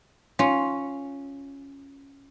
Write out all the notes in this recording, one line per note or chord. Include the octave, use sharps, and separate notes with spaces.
C#4 F4